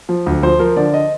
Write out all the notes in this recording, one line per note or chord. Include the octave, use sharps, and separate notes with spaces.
F3
D2
F3 C5
F3 A#4
D3 D5
D#5